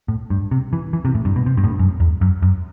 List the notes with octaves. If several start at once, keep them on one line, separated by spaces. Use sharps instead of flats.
A2
G2
C3
E3
E3
C3
A2
G2
B2
C3
G2
A2
G2
F#2
E2
F#2
F#2